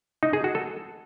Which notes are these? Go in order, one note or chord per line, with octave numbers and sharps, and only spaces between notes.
D#4
G#4
F#4
A4